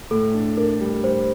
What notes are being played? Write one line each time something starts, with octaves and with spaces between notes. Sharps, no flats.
A2 A4
D4
D4 A#4
G3
G3 C5